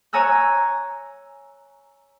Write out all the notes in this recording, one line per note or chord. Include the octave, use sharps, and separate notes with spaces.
C#5 G#5 A#5 E6 F#6